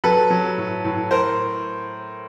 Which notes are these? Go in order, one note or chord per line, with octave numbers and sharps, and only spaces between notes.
F#3 A4 B4
F#3
A2
A2
A#4 C5